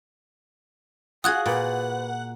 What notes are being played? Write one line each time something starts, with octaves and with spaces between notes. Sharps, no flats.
F4 F#4 G#4 F#5 G#5 D#6 F#6 G#6
A#2 B4 F#5